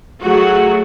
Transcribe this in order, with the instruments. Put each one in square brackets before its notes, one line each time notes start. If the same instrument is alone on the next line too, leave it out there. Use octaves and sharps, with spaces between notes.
[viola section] F#3 A3 F#4 G#4